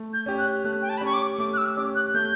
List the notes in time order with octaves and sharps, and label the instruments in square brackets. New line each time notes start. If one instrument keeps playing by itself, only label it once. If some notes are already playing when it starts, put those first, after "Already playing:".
Already playing: [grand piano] A3
[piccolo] G6
[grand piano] C#4 G4
[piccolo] F#6
[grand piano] A3 [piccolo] F#6
[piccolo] G5
A5
B5
[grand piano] C#4 G4 [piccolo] C#6
[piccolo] D6
[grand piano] A3 [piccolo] D6
[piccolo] F#6
E6
[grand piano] C#4 G4 [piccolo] D6
[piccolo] F#6
[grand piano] A3 [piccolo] G6